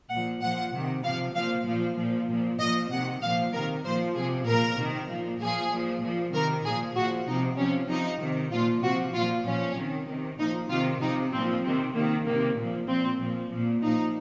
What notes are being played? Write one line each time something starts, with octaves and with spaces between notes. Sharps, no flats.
A#2 F3 F#5
A#2 F3 F#5
C3 D#3
C3 F3 F5
A#2 F3 F5
A#2 F3
A#2 F3
A#2 F3
A#2 F3 D#5
C3 D#3 F#5
A#2 F3 F5
C3 D#3 A#4
A#2 F3 C5
C3 F3 G#4
A#2 F3 A#4
C3 D#3
A#2 F3
A#2 F3 G#4
A#2 F3
A#2 F3
C3 D#3 A#4
A#2 F3 G#4
A#2 F3 F#4
C3 F3 D#4
C3 F3 C#4
C3 F3 D#4
C3 D#3
A#2 F3 F4
C3 F3 F#4
A#2 F3 F4
A#2 F3 C#4
C3 D#3
C3 D#3
A#2 F3 D#4
C3 D#3 F4
C3 F3 D#4
A#2 F3 C4
C3 D#3 C4
C3 D#3 A#3
C3 D#3 A#3
A#2 F3
A#2 F3 C4
A#2 F3
A#2 F3
A#2 F3 D#4